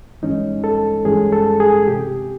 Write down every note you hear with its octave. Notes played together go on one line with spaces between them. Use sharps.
G2 E3 G#3 C#4 D#4
A4
G2 E3 G#3 C#4 G#4
A4
G#4
C3 G4